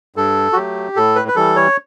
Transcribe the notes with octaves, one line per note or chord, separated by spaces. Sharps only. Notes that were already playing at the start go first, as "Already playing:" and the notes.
G2 A4
F#4
F#3 A3 G4
A2 A4
B4
B4
E3 G3 A4
C#5